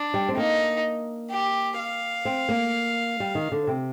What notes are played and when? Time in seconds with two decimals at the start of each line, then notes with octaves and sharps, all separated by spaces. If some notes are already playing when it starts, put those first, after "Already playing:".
Already playing: D4
0.14 G3
0.29 C4
0.37 A#3 D#4
1.31 G4
1.78 F5
2.25 C4
2.49 A#3
3.20 G3
3.35 D#3
3.52 D3
3.67 C3